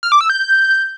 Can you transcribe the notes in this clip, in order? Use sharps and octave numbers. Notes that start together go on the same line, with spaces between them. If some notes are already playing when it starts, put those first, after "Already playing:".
F6
D6
E6
G6